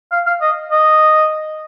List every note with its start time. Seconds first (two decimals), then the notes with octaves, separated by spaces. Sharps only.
0.12 F5
0.26 F5
0.41 D#5
0.71 D#5